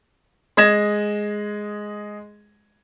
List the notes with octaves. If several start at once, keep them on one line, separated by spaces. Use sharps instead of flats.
G#3 D#5 G#6 A#6 E7